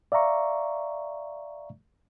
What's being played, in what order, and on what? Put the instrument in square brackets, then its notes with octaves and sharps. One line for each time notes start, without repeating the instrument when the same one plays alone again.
[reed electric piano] D5 E5 F5 A#5 C#6